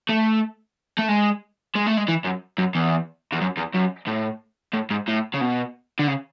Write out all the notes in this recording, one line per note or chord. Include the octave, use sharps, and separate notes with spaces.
A3
A3
G#3
G#3
A3
G#3
E3
F#2
F#2
E2
E2
F#2
E2
F#2
A2
A2
G#2
A2
C#3
B2
D3
C#3